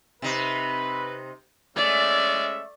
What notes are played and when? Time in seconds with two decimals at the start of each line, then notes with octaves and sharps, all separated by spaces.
0.22 C3 D#4 B4
1.76 G#3 A3 C#4 D5 E5